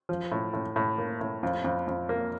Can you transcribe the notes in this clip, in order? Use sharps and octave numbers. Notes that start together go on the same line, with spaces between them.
F3
A2
A2
A2
A#3
A2
F2
F2
F2
A#3